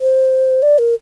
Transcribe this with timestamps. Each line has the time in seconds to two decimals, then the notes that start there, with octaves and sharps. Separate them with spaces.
0.01 C5
0.62 D5
0.78 A#4